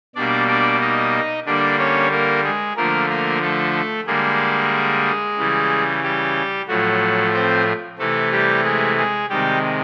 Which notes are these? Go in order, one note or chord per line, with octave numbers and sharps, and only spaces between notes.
B2 G3 A#3 D4 D5
D4 D5
D#4 D#5
D3 G3 A#3 D4 D5
C#4 C#5
A#3 A#4
G#3 G#4
D3 F3 A3 A#3 A#4
A#3 A#4
A3 A4
D3 G3 G#3 A#3 G#4
C#3 E3 G3
G3 G4
A2 F3 F#3 A3 F#4
C4 C5
C3 E3 A3 A4
G3 G4
G#3 G#4
G#3 G#4
C3 D#3 G3 G#3 G4